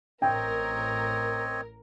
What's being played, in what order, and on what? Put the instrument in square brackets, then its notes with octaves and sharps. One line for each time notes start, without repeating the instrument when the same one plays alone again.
[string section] A1 A#4 [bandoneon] C4 C#5 D#5 [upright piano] G5